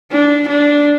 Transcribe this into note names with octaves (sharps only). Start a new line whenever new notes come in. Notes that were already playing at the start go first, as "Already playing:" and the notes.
D4
D4